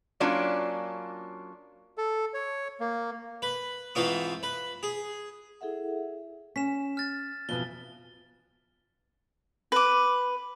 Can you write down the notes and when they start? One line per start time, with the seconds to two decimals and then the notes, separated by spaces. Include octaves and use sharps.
0.20 F#3 A#3 C#4 D4 F4
1.98 A4
2.34 C#5
2.80 A#3
3.42 B4
3.95 G#2 E3 C4 F4 C#6 D#6
4.43 B4
4.83 G#4
5.61 E4 G#4 A4 E5 F#5
6.56 C#4 B6 E7
6.97 F6 A6
7.49 F2 B2 E3 G7
9.72 B4 D6